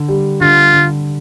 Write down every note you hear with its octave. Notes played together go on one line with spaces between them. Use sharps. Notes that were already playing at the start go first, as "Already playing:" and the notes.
Already playing: D3
G3
D3 F4
D3